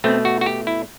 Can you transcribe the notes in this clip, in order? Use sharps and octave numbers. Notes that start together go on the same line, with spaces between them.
B2 A3 C4
F#4
F#4
G4
E4